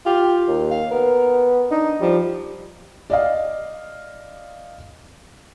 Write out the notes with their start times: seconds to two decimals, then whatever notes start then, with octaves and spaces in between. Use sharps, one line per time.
0.06 F4 G4
0.48 D#2
0.71 F5
0.91 B3 A#4
1.71 D4 D#4
2.00 F3 G3
3.10 D5 D#5 F5